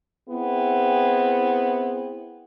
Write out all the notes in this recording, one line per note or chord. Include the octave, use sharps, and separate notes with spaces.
B3 C4 E4 G#4